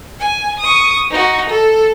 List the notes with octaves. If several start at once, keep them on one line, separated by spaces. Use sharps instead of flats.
G#5
C#6 D#6
D#4 F#4
A4